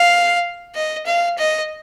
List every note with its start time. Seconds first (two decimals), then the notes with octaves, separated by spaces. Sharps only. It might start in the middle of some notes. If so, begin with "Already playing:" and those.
Already playing: F5
0.75 D#5
1.06 F5
1.38 D#5